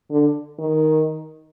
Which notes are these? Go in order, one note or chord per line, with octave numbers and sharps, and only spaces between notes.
D3
D#3